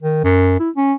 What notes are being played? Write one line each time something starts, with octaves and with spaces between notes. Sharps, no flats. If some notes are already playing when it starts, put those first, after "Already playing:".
D#3
F#2
E4
C#4